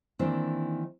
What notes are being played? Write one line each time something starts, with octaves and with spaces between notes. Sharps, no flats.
D#3 E3 A#3 C4 D4